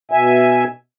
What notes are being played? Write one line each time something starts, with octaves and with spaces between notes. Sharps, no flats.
B2 E5 G#5